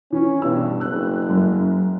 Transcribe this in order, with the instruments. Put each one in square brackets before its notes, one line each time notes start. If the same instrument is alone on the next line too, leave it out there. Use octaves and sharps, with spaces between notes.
[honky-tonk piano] E3 [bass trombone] C#4
[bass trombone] G2 [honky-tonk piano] B2 E6
[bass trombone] F#1 [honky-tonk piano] E6 F#6
[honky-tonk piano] F#2